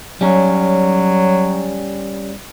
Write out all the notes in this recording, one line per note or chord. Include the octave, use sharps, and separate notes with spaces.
F#3 G3 C#4